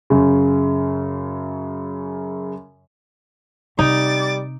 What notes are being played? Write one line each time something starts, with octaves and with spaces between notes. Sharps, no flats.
F#2 C#3
C3 G3 D#4 D6 A6